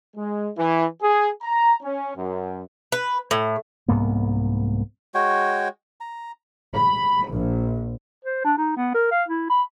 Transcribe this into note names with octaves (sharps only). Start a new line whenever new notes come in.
G#3
E3
G#4
A#5
C#4
F#2
B4
A2
C2 G#2 A#3 B3
G#3 F#4 C#5 G5
A#5
B5
A#1
C5
D4
D#4
B3
A#4
F5
E4
B5